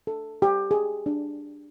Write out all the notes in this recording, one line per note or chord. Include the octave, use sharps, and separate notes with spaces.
A4
G4
G#4
D4